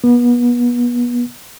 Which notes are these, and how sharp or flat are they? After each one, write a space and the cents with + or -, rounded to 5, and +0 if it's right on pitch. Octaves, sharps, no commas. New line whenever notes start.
B3 -30